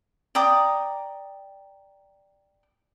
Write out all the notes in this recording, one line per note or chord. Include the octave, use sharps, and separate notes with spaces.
D5 G5 A#5 D#6